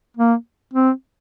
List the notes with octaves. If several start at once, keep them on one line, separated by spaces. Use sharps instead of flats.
A#3
C4